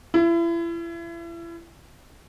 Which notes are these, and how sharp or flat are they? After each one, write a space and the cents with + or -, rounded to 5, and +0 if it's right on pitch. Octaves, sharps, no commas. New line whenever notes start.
E4 +35